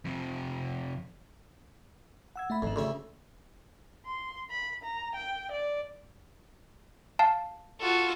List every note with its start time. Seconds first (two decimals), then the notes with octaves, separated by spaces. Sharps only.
0.05 F2 C3
2.36 F#5 E6 G#6
2.50 A3 E5 B5
2.62 G#1 F2 D#3
2.76 D2 C#3 E5 C6
4.06 C6
4.50 B5
4.83 A#5
5.16 G5
5.52 D5
7.19 F5 A5
7.81 F4 F#4 A4